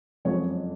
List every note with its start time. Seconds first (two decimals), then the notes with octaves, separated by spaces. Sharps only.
0.25 F#1 F2 F3 G#3 C#5